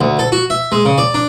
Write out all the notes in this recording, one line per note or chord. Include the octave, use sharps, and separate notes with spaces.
D2
A4
F#4
E5
G#3
C#3
D5
D4